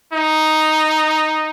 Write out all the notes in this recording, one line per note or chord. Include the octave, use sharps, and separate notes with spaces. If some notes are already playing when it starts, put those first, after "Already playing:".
D#4